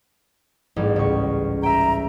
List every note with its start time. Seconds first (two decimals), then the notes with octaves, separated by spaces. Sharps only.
0.76 A1 G#2 G3
0.96 C#2 C#6
1.63 E5 G5 A#5